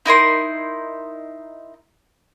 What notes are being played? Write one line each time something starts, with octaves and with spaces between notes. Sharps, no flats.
D#4 E4 A#4 C6